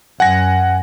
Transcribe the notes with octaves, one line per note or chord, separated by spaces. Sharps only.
F#2 F#5 G#5 A#6